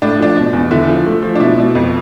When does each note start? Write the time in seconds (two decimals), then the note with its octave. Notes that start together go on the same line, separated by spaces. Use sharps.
0.02 A2 D4
0.19 F3 D4
0.36 B2
0.53 E2
0.71 D3 E4
0.88 F3
1.06 A3
1.22 F3
1.35 D4
1.40 B2 E4
1.58 B2
1.75 F2